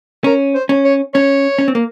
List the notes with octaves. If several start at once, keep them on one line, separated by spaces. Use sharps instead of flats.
C#4 A#4
C5
C#4
C#5
C#4 C#5
C#4
C4
A#3